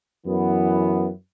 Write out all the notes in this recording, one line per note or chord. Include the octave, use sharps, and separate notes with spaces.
F#2 E3 B3